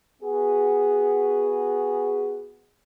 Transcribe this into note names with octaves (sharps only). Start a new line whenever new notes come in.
B3 F#4 G#4